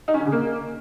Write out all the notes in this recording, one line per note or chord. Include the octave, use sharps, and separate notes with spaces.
D#4
C#4
D3
C#3
A#3